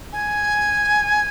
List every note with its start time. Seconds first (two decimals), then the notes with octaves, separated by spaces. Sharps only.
0.12 G#5